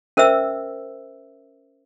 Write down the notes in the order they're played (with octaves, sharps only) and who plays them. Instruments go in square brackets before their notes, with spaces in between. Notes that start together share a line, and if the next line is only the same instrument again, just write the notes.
[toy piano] C#4 A#4 C5 E5 E6